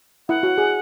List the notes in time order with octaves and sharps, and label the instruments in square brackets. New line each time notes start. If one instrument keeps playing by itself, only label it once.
[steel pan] E4 [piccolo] F#5
[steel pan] F#4
G#4